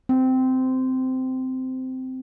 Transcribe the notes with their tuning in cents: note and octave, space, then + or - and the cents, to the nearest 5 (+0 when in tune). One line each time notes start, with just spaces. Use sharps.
C4 -15